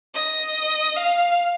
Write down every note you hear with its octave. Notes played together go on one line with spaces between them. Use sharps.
D#5
F5